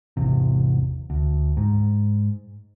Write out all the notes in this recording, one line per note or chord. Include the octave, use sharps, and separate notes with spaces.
G#1 E2 C3
D2
G#2